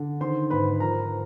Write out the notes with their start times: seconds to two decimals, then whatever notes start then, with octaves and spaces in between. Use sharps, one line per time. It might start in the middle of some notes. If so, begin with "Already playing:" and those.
Already playing: D3
0.21 D#3 C5 C6
0.50 G#2 B4 B5
0.80 F3 A#4 A#5